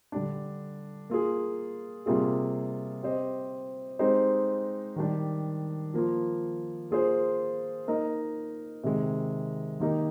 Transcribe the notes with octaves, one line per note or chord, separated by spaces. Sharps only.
D3 G3 D4
A#3 F4 G#4
C3 G3 A#3 F4 G#4
C4 G4 C5 D#5
G#3 C4 D#4 G4 C5
D#3 G3 D4 G4
F3 A#3 F4
A#3 F4 G#4 C5
A#3 D#4 A#4 D#5
C3 D#3 G#3
D#3 A#3 D#4 G4 A#4